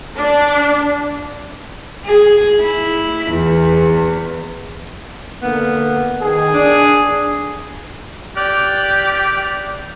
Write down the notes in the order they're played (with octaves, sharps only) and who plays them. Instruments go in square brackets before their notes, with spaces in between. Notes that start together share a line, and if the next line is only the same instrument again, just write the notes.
[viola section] D4
[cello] G#4
E4
E2
[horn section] D3 A#3 B3
[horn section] D#3 [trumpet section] G#4
[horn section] D4
[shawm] G4 [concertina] D5 F6 F#6